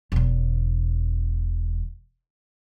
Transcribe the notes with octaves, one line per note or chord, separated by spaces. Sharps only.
E1 E2